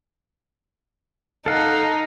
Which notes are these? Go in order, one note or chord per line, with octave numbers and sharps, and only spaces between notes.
D#4 A4 F5 F#5